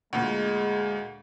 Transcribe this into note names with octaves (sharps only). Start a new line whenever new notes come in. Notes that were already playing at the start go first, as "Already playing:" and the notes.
D2 A#2 G#3